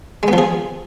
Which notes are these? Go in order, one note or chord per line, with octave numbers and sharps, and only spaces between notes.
G#3
B3
F3
G#4